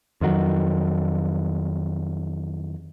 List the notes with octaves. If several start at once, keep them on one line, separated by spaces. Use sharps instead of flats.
F2 D#3 F#3